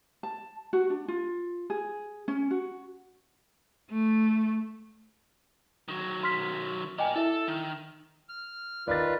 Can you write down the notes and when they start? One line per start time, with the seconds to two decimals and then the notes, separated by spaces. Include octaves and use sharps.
0.23 A5
0.73 F#4
0.90 D4
1.08 F4
1.70 G#4
2.28 C#4
2.51 F#4
3.90 A3
5.88 D#3 F#3
6.23 C6 F6 B6
6.99 A#4 D5 D#5 G5 G#5
7.16 E4 A4 E5
7.48 D#3
8.29 F6
8.88 D#3 F4 B4 D5 A6